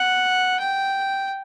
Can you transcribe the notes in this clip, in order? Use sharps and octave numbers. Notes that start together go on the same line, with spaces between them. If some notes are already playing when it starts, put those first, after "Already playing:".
Already playing: F#5
G5